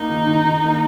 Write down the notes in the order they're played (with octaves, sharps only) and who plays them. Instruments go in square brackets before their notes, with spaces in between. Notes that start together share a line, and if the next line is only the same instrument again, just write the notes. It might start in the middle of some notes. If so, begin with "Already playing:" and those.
Already playing: [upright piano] A#3 [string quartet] D#4
[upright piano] D#3
D#3
D#3
A#3